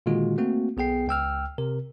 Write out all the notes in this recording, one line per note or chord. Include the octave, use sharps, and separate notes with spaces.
A#2 D3 D#3 G#3 F4 F#4
A3 A#3 C4 F#4
B1 B3 G#4 G5 C7
C#2 G5 E6 F6
C3 A#4